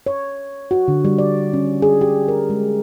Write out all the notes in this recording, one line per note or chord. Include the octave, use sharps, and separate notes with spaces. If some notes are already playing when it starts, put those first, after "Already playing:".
C#5
F#4
D3
G3
D5
C#4
G#4
G4
A#4
G#3